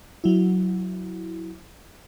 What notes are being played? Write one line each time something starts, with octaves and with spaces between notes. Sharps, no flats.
F#3 E4